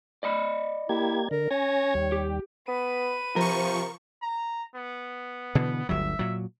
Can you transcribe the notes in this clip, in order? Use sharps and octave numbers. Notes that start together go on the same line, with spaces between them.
D5 D#5 B5
A#3 E4 G4 G#6
D3 A#4
C#4 C#5 G#5 A#6
D#2 G3
G4
B3 B4 D#7
C3 F3 A#4 C#6
A#5
B3
B2 D3 E3
G1 D2 F#3 E5
A#2 F#3